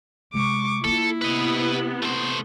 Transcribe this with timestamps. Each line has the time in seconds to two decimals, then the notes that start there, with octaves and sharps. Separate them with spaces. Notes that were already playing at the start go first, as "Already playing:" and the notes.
0.34 C3 G#3 C#6 D6
0.84 A#3 E4 F4 A4
1.22 C3 B3 B4 D#5
2.03 A3 C5